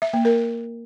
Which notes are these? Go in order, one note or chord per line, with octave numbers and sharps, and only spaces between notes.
E5
A#3
A#4